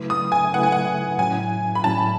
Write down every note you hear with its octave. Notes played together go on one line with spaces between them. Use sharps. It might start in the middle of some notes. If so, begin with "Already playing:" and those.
Already playing: C#3 F#3 A3 E4 B4
D#6
G#5
C#3 F#3 A3 E4 B4 F#5
G#5
F#5
A2 F#3 C#4 E4 G#5
B5
A2 F#3 C#4 E4 A5